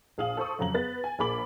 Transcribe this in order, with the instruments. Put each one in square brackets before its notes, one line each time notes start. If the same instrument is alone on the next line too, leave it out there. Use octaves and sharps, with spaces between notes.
[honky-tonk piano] A#1 G#4 F5 D#6 F#7
A4 C5 C#6 D#6
F2 C#3 F#3 A#5 F#7
B3 G#4 B4 A6
G#5
A#1 A#3 G#4 B5 D6 F#7